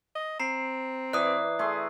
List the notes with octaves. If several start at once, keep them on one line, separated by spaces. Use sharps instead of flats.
D#5
C4 A#5 C7
E3 D5 D#6 F#6
A3 G#4 C6